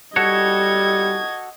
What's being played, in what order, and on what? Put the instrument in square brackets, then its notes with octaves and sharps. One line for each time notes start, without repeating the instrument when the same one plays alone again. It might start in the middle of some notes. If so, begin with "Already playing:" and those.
[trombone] G3 [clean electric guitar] F#4 A4 C#5 [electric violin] D#5 G#6